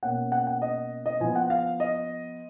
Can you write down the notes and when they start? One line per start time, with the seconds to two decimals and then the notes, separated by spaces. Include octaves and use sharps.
0.03 B2 A#3 C#4 F#5
0.32 F#5
0.47 F#5
0.62 D#5
1.06 D#5
1.20 F3 B3 G#5
1.35 F#5
1.50 F5
1.80 D#5